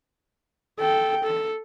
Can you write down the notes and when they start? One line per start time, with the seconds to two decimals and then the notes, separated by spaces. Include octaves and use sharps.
0.80 A4 G5
1.24 A4